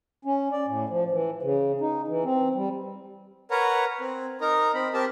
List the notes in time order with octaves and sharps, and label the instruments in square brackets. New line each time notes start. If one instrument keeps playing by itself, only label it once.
[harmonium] C#4
D5
A2
F3
E3
C#3
D#4
E3
C4
G3
[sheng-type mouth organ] A#4 B4 C#5 F#5 A#5
C4
D#4 A#4 A#5
C4 B5
C4 G4 A#4 A5